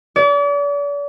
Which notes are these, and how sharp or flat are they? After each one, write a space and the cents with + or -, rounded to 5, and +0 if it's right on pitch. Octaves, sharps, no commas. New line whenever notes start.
D5 -40